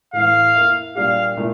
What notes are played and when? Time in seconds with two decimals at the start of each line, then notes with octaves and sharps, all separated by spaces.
0.13 A2 E3 A3 F5
0.55 A#3 E4 A#4 E5
0.95 A#2 G3 D4 G4 F5
1.37 A#2 A3 E4 A#4